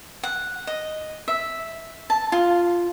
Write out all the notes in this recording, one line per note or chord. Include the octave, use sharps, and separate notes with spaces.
F#5
D#5
E5
A5
F4